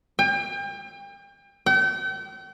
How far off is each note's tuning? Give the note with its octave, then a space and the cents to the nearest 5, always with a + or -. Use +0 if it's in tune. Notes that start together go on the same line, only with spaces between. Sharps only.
G5 +35
G5 -40